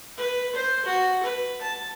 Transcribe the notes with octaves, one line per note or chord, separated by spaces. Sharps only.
B4
C5
F#4
B4
A5